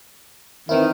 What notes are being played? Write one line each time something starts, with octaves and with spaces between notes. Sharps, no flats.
D#3 E3 C4 E4